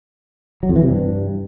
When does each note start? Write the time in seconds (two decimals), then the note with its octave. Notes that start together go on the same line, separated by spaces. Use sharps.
0.63 F#3
0.69 F2
0.76 E3
0.82 C3
0.89 G2